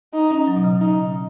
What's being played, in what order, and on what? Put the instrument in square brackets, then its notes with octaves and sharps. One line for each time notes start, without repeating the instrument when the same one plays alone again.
[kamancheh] D#4
[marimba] C#4
F#3
B2
C#3
[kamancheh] D#4